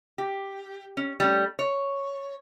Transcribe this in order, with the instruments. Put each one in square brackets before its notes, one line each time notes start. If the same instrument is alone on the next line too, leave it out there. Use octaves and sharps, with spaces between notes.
[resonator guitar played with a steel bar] G4
C#4
G3 A3 C#4
C#5